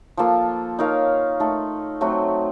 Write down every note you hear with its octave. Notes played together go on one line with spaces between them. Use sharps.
F3 A#3 F4 A4
D#4 A#4 C#5 F5
A3 D#4 A4
F#3 A3 C4 F#4